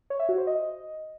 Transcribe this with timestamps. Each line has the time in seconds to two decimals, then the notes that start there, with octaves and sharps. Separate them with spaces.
0.10 C#5
0.20 E5
0.29 F#4
0.38 C5
0.47 D#5